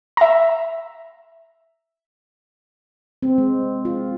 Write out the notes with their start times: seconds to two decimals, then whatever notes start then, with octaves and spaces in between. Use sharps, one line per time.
0.17 E5 A#5
3.23 C4
3.38 G#3
3.85 F4